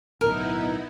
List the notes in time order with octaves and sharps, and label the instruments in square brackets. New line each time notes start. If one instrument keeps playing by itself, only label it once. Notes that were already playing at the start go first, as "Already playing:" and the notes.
[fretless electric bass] D1 B1 [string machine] B3 D#4 E4 [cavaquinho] A#4